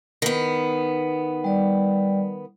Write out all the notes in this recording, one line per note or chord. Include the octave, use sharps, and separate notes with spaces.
D#3 B3
G3 D5